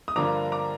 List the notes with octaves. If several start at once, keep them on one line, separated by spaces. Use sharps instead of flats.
D#6
G2 D3 F3 A#3 D4 A#5 D6
A#5 D6